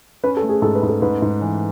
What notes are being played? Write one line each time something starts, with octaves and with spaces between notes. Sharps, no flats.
C#4 B4
A4
A3
G#4
G#2 A4
B4
G#2
A4
G#2 B4
G#2
E3